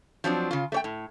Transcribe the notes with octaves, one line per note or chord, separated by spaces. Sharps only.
F3 F#3 C4 D4
C#3 F4
A3 C#5 G5
A2